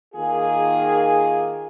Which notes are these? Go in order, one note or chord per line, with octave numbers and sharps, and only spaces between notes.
D#3 A#3 F4 G#4